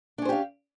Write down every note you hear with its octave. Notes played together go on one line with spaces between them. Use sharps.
C#4 D4 G4 C5 F5